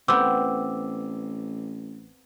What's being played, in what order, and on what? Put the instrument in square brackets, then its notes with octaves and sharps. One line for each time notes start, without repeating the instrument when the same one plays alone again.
[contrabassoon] A1 [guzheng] B3 C4 [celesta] D6 E6